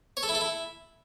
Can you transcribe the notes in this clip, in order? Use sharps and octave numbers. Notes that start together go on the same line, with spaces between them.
C#5
A4
E4
A4
E4